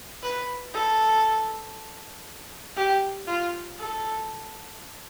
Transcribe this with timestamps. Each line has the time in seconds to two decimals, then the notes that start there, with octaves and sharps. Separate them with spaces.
0.23 B4
0.73 A4
2.76 G4
3.27 F4
3.79 A4